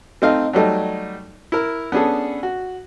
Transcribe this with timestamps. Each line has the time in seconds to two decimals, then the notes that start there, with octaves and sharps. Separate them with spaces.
0.22 A3 C4 D#4 F5
0.53 F#3 G3 A3 D#4
1.52 E4 A#4
1.92 B3 C#4 D4 G#4 A4
2.43 F#4